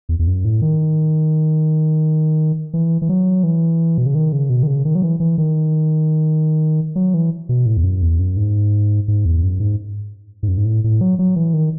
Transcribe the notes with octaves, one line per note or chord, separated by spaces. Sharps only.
E2
E2
F#2
A2
D#3
E3
E3
F#3
E3
B2
C#3
D#3
C#3
B2
D#3
C#3
D#3
F#3
E3
E3
D#3
F#3
E3
B2
A2
E2
F#2
E2
F#2
G#2
G#2
E2
F#2
G#2
G#2
F#2
G#2
A2
A2
F#3
F#3
E3
D#3